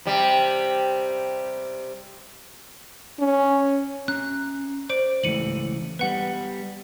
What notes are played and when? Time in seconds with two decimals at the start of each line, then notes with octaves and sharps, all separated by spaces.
0.05 C3 G3
3.19 C#4
4.08 C#4 A#5 F#6
4.90 C5 D5 D7
5.23 C#2 E3 A3 C#7 D#7 F#7
5.99 G3 B3 B4 F#5